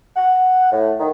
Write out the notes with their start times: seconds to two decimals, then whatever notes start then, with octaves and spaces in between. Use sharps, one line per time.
0.16 F#5
0.72 A2
1.00 D#3